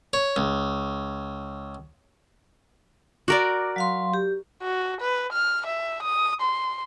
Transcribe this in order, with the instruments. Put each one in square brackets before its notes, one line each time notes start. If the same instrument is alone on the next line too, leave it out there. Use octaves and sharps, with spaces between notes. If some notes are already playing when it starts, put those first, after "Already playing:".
[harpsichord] C#5
C#2
[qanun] F#4 A#4 D5 [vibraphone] D6
[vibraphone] F#3 F5 C6
G4
[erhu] F#4
B4
F6
E5
D#6
C6